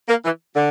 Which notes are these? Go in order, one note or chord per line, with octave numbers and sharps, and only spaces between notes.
A#3
E3
D3